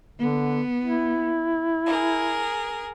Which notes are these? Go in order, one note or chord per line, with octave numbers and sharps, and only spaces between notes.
D3 B3
E4
G#4 A#4